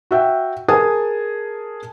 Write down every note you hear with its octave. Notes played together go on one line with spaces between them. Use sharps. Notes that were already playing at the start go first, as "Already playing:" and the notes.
F#4 E5 G5
G#4 A#4 G#5 A5 D#6